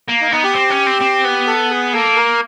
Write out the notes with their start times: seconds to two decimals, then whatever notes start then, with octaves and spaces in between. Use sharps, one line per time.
0.09 A#3
0.21 D#4
0.32 B3 D#4
0.44 G4
0.55 C4
0.70 C#4
0.86 C4
1.01 C4
1.25 B3
1.47 A4
1.70 G#4
1.93 A#3 A4
2.17 A#4